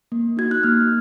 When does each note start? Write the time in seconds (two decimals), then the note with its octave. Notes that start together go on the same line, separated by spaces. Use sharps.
0.12 A#3
0.37 D#4 F#4 G#6
0.51 F#6
0.63 A#3 F6